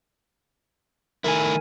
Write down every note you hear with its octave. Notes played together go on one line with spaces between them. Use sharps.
D#3 A3 E4 A#4 G#5